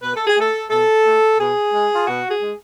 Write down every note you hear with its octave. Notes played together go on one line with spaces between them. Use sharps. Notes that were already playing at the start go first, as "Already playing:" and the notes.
B2 B4
A4
G#4
A3 A4
B2 A4
A3
B2 G#4
G#3
F4
B2 F#4
G#4
G#3